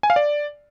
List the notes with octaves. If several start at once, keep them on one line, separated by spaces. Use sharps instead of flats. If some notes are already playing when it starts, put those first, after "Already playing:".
G#5
F5
D5